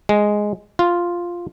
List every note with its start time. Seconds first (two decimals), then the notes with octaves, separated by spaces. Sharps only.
0.09 G#3
0.79 F4